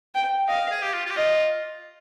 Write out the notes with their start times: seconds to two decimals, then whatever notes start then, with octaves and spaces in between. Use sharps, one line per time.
0.15 G5
0.48 D#5 F5
0.71 G#4
0.82 G4
0.93 F4
1.05 F4
1.11 G4
1.16 F4 D#5